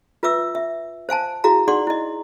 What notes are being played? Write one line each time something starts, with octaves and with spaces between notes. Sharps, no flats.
F4 B4 E5 D6 E6
E5
C5 F5 G#5 A5
E4 F#4 G#4 F5 A#5
D#4 G#4 D5 F#5 C6 D6
E4 D#5